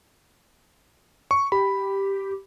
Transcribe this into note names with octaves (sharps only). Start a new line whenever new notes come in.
C#6
G4 B5